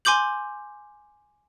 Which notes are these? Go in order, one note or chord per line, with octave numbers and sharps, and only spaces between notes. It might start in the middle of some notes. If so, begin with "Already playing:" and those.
G#5 C6 D6 G6 F#7